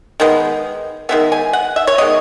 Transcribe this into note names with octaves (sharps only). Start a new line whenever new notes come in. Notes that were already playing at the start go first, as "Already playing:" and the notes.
D#3 G#3 B3
D#3 G#3 B3 E5
G#5
F#5
E5
C#5
D#3 G#3 B3 D#5